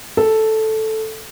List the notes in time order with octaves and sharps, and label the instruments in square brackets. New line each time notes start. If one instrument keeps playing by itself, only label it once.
[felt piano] A4